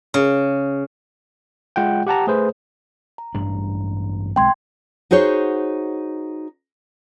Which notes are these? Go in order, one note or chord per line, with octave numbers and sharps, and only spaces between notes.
C#3
G#3 F4 F#5 G5
G4 F#5 A5 A#5
A3 G#4 B4 C5
A#5
A1 G2 D4
B1 G#3 C4 G5 C6 G#6
D#4 F#4 G#4 C5 C#5